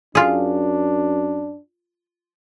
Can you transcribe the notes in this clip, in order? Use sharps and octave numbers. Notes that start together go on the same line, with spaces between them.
F#2 D4 F4 G#4